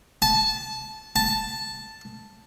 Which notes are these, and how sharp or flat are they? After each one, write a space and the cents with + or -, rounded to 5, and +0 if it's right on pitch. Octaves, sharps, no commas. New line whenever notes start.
A5 -15
A5 +0